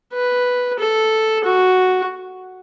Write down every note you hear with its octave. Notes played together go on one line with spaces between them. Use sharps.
B4
A4
F#4